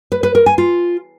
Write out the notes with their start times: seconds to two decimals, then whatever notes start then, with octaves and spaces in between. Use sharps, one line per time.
0.12 B4
0.23 B4
0.35 A#4
0.46 G#5
0.58 F4